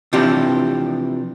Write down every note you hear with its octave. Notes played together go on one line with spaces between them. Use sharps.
C3 E3 F3 D4 G4